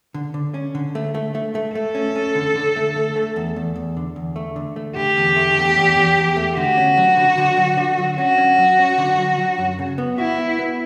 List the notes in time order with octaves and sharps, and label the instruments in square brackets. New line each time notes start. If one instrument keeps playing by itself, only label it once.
[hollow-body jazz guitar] D3
D3
C#4
D3
A3
A3
A3
A3
[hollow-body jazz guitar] A3 [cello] A4
[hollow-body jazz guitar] C#4
C#4
D3
D3
A3
A3
A3
E2
E2
E2
D3
E2
A3
D3
A3
[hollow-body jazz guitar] D3 [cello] G4
[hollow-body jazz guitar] E2
A3
E2
E2
E2
E2
A3
[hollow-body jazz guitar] D3 [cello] F#4
[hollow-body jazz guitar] C#4
F#3
D3
D3
F#3
D3
F#3
[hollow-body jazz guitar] C#4 [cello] F#4
[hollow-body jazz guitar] C#4
F#3
C#4
D3
F#3
F#3
F#2
C#3
B3
[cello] E4 [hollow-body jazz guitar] F#4
[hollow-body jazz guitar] B3
B3